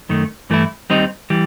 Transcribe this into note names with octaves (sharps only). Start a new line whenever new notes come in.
F#2 D#3 A3
G2 E3 A3 E4
D#2 D#3 G3 C4 D#4
E3 G3